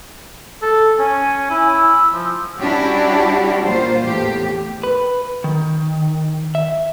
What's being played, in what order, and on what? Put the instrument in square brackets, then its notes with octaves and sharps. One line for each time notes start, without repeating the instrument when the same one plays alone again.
[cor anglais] A4
[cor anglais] C#4 [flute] G#5
[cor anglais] E4
[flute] E6
[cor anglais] F3
[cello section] G3 C#4 D4 E4 F#4 G4
A#2 F4 C5
E2 A2 G4
[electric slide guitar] B4
D#3
E5